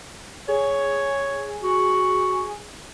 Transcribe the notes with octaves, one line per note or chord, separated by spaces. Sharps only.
G#4 C#5
F#4